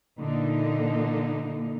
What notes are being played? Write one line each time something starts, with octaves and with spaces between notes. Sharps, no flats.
A#2 D3 E3 A#3 D#4